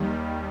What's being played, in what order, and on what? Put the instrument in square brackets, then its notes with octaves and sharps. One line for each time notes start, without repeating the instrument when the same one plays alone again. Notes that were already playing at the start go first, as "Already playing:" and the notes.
Already playing: [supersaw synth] D#2 D#3 G3